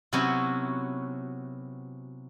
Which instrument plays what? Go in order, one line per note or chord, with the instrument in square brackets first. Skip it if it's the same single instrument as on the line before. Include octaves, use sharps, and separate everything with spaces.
[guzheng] C3 F#3 B3 C#4 E4 F#4